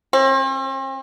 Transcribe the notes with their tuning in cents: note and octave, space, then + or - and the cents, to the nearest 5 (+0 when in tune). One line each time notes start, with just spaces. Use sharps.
C4 +45